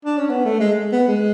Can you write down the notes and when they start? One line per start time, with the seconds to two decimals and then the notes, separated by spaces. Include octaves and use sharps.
0.05 D4
0.18 C#4
0.30 B3
0.45 A3
0.60 G#3
0.92 B3
1.08 G#3